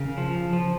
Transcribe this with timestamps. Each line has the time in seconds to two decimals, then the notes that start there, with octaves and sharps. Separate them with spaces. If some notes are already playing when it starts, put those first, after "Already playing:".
Already playing: C#3 A#4
0.18 F3
0.53 F3